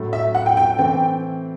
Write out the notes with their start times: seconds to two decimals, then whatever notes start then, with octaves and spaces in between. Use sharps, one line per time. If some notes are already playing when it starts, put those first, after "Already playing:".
Already playing: A2 F#3 A3
0.13 E5
0.35 F#5
0.46 G5
0.57 G5
0.79 E3 A3 C4 G5